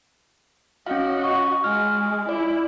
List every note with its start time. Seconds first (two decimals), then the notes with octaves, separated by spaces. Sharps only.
0.86 C#4 F#4 D#5 F5
1.24 C#6
1.64 G#3 F6
2.29 E4 D5